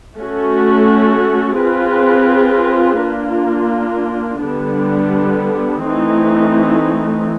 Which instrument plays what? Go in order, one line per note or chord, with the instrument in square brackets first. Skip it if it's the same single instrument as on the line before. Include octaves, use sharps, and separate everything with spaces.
[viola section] A3 C#4 F#4 A4
C4 F4 G#4 B4
A#3 D4 F4
D3 G3 B3 D4
E3 A3 C4 D#4